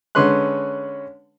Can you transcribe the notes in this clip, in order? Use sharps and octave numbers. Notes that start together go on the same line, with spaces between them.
D3 G#3 C#4 B4 C6 F#6